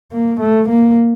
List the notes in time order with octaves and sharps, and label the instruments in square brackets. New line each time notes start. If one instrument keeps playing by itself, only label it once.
[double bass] A#3
A3
A#3